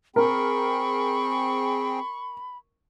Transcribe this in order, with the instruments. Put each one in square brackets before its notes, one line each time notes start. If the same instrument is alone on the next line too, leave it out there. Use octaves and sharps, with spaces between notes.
[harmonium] C4 G#4 G5 [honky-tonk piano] A#4 [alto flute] B5 [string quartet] C#6